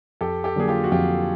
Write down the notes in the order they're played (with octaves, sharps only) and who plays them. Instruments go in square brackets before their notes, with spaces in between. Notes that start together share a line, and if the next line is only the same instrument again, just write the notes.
[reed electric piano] F2 [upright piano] G4 A4
[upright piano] G4 A4
[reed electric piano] D3 F#3 A#3 D4 [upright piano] G#4
[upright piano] F4 G4
F#4
[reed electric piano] F2 [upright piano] F4 G4